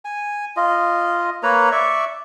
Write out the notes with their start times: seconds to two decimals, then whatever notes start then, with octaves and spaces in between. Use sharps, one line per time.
0.05 G#5
0.57 F4 D#5
1.43 A#3 B4 C#5 A#5
1.72 D5 E5 C#6